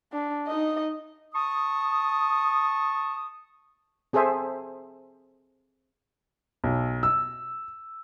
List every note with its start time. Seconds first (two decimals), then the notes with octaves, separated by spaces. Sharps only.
0.12 D4
0.48 D#4 D#5
1.34 A5 C#6 D#6
4.13 C4 G#4 A4 C5 E5
6.64 B1
7.03 E6